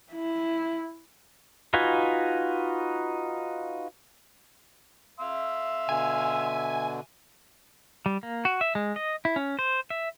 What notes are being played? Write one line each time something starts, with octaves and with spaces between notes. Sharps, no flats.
E4
D#4 F4 F#4 B4 G#5
E5 F5 C6 E6
B2 D3 G#5
G3
A#3
F#4
E5
G#3
D#5
E4
C#4
C5
E5